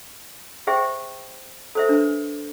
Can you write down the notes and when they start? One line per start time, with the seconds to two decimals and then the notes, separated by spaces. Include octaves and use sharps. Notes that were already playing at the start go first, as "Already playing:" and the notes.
0.67 G4 G#4 C5 E5 G5
1.75 A4 C5 E5
1.89 D4 B4